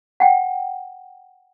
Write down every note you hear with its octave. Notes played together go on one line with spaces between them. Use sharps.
F#5 G5